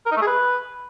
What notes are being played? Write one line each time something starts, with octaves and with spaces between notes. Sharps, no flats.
A#4
D#4
A3
G#4
B4